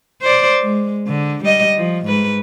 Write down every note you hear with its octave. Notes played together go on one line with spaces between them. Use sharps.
C5 D5
G#3
D3
G3 D#5
F3
G#2 B4